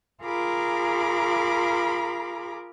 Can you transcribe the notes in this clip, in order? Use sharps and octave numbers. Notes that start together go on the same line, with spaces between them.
F4 G#4 A#4 A#5 B5 D6